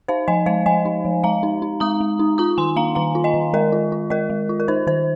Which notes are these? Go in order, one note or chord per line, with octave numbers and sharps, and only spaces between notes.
D#4 C5 F5
F3 D#5 G#5
G#3 C5 F5
F3 D#5 G#5
D#4
F3
G#3 F5 A#5
D#4
D#4
G#3 A#5 D#6
G#3
D#4
F4 A#5 D#6
D#3 G#5 C6
A#3 F5 A#5
D#3 F5 A#5
F4
D#5 G#5
D#3
G#3 A#4 D#5
F4
F4
G#3 A#4 D#5
G#3
F4
A#4
D#4 C5
D#3 C5